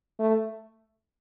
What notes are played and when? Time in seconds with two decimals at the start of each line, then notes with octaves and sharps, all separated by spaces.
0.19 A3